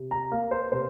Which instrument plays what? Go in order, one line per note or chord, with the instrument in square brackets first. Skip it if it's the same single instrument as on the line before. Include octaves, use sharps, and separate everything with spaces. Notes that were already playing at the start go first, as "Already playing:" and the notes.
Already playing: [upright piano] C3
A#5
A#3 F5
C5
C3 C5